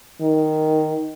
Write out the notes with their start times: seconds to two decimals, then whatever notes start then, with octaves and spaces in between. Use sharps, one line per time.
0.21 D#3